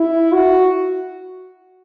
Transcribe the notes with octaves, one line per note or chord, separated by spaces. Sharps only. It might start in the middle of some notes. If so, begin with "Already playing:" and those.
Already playing: E4
F#4